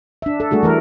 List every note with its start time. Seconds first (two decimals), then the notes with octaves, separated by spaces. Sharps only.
0.22 D4 E5
0.40 A4
0.51 G3 A3 D4 F#4 G#4
0.63 E3 A3 A#4